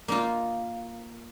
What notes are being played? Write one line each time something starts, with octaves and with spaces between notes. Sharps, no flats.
A#3 D#4 F4